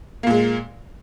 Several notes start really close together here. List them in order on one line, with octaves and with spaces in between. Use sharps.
A#3 A#2 G#3